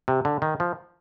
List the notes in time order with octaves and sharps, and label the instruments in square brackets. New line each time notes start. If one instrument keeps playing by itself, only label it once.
[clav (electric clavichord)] C3
D3
D#3
F3